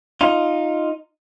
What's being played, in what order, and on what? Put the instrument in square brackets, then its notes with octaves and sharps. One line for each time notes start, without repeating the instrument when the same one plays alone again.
[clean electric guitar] D#4 F4